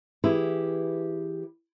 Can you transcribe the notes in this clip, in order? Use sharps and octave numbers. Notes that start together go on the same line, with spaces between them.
E3 E4 G4 G#4 B4